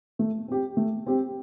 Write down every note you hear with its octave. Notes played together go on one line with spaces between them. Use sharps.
A3
C4 G4
A3
C4 G4